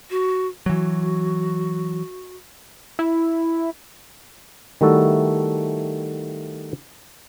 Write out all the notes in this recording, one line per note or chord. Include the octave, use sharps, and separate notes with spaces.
F#4
E3 F#3 F#4
E4
D#3 G3 A3 E4 F#4 A4